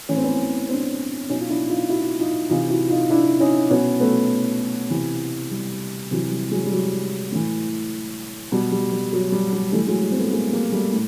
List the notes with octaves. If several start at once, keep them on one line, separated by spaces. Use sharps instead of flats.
A2 E3 C#4
C4
B3 C#4
C4 D4
B2 C#4 D#4
F4
D4 E4
D#4 F4
E4 F#4
D#4 F4
C3 E3 D#4 F4
E4 F#4
D#4 F4
D4 E4
C#4 D#4
B2 B3 C#4
A3 B3
C3 E3
G3
C3 E3 F#3
G3
F#3 G#3
G3
F#3
A2 E3
B2 G3
G3
G3
F#3
G3
G3
A2 E3 G3 A3
F#3 G#3
G3
C4
A3 B3
G#3 A#3
G#3 A#3
G3 A3
A2